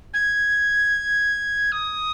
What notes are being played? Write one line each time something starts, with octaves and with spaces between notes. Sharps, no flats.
G#6
D#6